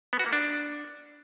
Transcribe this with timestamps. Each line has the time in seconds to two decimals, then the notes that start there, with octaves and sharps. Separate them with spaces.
0.13 B3
0.19 F#4
0.26 A#3
0.33 D4